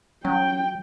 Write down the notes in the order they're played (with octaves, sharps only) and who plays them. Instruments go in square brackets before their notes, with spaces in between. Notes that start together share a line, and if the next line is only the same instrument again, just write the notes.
[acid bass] F#3 [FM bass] C#4 [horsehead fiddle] G5